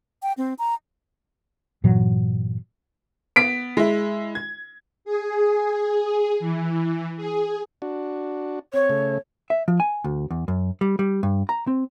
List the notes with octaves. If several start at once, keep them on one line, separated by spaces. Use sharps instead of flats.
G5
C4
A#5
G2 A#2 E3 F#3
B3 B6 D7
G#3 E4
G#6
G#4
E3
G#4
D4 F#4
C4 C#5
C#3 A3
E5
F3
G#5
D2
E2
F#2
G3
G3
G2
A#5
C4